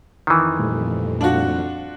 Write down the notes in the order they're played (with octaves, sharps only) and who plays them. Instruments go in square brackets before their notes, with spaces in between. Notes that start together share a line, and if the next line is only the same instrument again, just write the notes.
[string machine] F2 [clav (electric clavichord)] D#3 E3
[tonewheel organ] A#2 G3 A3
[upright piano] D4 F4 F#4